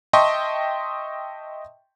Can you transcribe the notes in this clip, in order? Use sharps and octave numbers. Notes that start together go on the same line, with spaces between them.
D#5 E5 G5 A5 C6 C#6